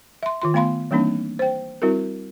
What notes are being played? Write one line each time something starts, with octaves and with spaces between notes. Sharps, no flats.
E5 C6
D#3 F4 C6
A3 B3 F5 B5 C6
E3 G3 A#3 C4 D4 D#4
C5 G5
G3 C4 E4 F#4 A#4